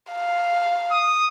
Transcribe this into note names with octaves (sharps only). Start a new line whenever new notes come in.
F5
D#6